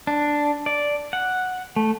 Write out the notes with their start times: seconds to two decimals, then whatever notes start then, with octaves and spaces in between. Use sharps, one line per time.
0.07 D4
0.66 D5
1.13 F#5
1.76 A3